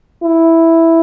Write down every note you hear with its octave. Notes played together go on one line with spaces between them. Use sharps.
E4